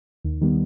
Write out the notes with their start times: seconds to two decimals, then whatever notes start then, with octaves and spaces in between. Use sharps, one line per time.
0.24 D#2
0.41 D#3 G3 B3